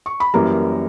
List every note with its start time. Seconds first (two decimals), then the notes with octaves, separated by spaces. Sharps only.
0.06 C#6
0.20 B5
0.34 F#2 E3 G3 A#3 A#5